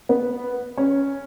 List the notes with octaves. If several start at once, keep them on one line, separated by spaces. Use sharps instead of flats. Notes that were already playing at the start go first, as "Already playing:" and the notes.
B3
C#4